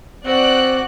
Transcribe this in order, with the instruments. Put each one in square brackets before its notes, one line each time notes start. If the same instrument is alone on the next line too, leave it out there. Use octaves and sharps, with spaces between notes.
[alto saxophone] C4 [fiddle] F#4 [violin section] D5 F#6